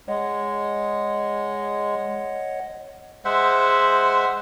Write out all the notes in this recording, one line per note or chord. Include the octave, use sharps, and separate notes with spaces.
G#3 C#5 D#5 F#5
G#3 C5 E5 F#5